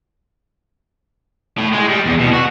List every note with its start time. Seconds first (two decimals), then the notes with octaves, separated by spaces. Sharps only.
1.58 A2
1.73 G#3
1.89 G3
2.05 E2
2.20 B2
2.33 F#4